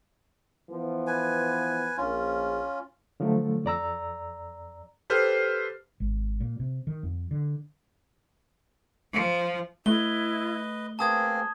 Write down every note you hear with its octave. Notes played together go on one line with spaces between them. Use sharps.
E3 F3 B3
B4 G#5
A#1 C#4 F4
D3 F3 F#3 A3
F2 D5 A#5 E6
G4 A4 B4 C5 F6 C7
G#1
A#2
C3
D#3
F2
D3
F3
A3 E4 B4 D#5 G7
A#3 C4 G#4 B4 A5 D#6 G#6